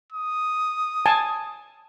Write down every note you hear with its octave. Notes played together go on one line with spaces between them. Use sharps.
D#6
G#5 A5